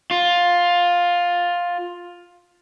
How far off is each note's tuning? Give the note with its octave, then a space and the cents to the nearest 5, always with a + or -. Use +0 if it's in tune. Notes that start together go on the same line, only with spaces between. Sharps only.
F4 +10